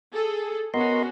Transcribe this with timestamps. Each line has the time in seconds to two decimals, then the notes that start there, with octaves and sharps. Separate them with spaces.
0.13 G#4 A4
0.74 B3 C#4 F#4 A#4 D#5 C6